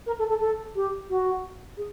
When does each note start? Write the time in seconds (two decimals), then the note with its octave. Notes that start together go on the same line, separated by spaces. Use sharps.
0.06 A#4
0.19 A4
0.29 A4
0.40 A4
0.75 G4
1.10 F#4
1.77 G#4